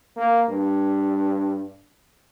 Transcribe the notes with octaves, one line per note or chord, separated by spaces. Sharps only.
A#3
G2